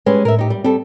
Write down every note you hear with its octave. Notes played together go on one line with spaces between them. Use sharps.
G3 G#3 C#4 B4
A2 A#4 E5
D#4 G4
G3
G3 C4 A4